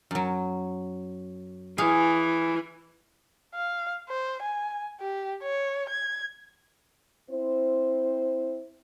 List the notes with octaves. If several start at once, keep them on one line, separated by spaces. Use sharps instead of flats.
F#2 F#3
E3 G#4 C#5 F5
F5
C5
G#5
G4
C#5
G#6
C4 E4 C5